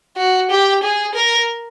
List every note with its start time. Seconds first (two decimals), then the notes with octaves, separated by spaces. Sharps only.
0.17 F#4
0.50 G4
0.83 G#4
1.15 A#4